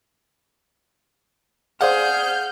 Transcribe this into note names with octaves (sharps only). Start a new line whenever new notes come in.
G#4 C5 D5 F5 F#5 F6 G6